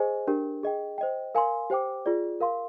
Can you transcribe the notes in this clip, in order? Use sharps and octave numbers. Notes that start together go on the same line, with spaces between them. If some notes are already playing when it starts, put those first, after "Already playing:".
Already playing: G#4 C5 D#5 G#5
D4 G4 A#4
G#4 D#5 G5
C5 D#5 G5
A#4 F5 G#5 C6
G4 C5 G5 D6
F4 G#4 D5
A#4 F5 C6